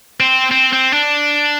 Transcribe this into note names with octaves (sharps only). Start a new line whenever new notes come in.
C4
C4
C4
D4